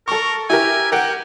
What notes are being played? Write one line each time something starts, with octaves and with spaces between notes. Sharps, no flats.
A4 A#4 C#6
E4 G4 A#4 G#5
G4 A#4 F#5 G5